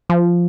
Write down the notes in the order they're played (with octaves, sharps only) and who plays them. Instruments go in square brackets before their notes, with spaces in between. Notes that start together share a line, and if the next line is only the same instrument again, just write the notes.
[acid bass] F3